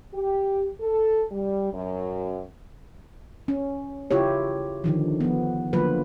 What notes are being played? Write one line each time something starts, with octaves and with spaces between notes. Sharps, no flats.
G4
A4
G3
F#2
C#4
C#3 E4 F4 G4 C#5
D3 D#3 F3
F3 B3
D3 F3 F#3 A#3 F4 B4